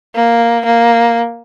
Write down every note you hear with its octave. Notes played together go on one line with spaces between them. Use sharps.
A#3
A#3